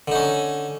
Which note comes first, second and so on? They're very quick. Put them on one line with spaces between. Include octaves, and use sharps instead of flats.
D3 D#4 C#4